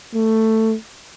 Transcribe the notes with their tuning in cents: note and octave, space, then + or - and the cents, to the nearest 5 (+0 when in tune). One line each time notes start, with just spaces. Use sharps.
A3 +10